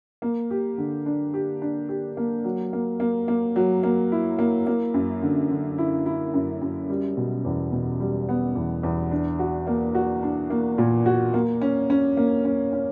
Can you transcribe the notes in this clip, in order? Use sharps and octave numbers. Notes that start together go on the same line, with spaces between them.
A#3
G4
D3
D4
G4
D4
G4
A#3
F#3
A#3
A#3
A#3
F#3
A#3
E4
A#3
A#3
F#2
D3
D3
E4
E4
F#2
F#2
G3
B2
E2
B2
G3
B3
E2
E2
D4
F#4
A#3
F#4
D4
A#3
A#2
F#4
A#3
C#4
C#4
A#3
C#4
C#4